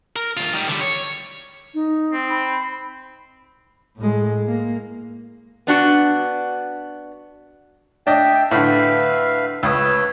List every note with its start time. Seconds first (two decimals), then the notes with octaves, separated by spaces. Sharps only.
0.16 A#4
0.37 D2 F4
0.53 D#3 G3
0.68 D3 G3
0.81 C#5
1.74 D#4
2.12 C4
2.30 B5
3.96 A2 G#3
4.46 A#3
5.67 B3 D4 F#4
8.07 D4 D#5 E5 G5
8.51 A2 D3 B4 E5 F5
9.63 C#2 B4 C#5 D#6 E6